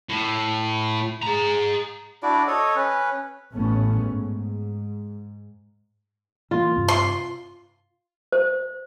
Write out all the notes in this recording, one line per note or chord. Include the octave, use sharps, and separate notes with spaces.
A2
G#4 A#5
D4 E4 F#4 D5
A4 C#5 D#5
C#4 B4
A1 A3 B3 C#4
G#2
E3 A#3 F4
G2 C3 C4
C6
C5